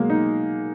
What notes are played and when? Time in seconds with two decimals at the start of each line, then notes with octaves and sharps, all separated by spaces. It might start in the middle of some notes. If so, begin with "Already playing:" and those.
Already playing: B2 F#3 G#3 A#3
0.10 D#4